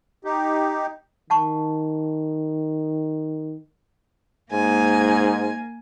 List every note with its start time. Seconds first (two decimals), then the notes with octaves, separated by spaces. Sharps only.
0.25 D#4 G4
1.30 D#3 F#5 A5 C#6
4.52 G#2 A#3 G#5